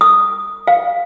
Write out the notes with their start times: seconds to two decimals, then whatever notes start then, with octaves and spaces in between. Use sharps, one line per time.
0.01 D#6
0.67 F5